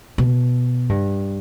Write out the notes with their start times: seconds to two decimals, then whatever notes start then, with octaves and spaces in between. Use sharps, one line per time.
0.18 B2
0.89 G2